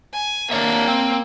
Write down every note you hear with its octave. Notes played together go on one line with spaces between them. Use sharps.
G#5
A#3 D4 C#5 E5
C4